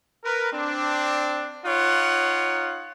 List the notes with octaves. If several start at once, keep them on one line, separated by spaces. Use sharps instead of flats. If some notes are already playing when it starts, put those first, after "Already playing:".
A#4 B4
C4 D4
D#4 F4 C#5 F#5